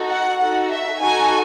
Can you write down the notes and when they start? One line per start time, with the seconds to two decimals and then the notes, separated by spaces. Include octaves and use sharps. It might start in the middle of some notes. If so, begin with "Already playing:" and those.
Already playing: D#4 F#4 A4
0.08 F#5
0.38 D#4 F#4 A4 F#5
0.70 E5
1.00 D#4 F#4 A4 G#5